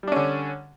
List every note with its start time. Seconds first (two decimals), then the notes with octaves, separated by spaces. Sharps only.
0.03 G3
0.08 D4
0.12 C#4
0.16 D3